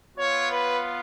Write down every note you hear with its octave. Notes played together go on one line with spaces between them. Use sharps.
B3 F4 C#5
B4